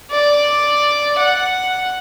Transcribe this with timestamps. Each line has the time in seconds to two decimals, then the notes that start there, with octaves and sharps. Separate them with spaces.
0.11 D5
1.19 F#5